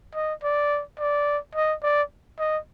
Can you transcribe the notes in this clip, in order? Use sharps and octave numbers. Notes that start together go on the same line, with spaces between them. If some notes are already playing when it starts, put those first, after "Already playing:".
D#5
D5
D5
D#5
D5
D#5